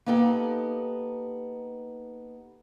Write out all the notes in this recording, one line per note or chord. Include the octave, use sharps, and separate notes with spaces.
A#3 B3 D#4 G4 A4